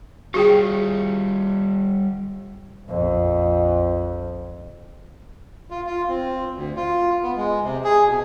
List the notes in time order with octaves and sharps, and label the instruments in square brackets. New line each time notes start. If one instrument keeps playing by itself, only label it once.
[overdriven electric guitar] G3 F4 [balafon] F#4 G#4 G5
[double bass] A#1 F2
[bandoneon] F4
F4
C4
D2
F4
B3
G#3
C3
G#4
B2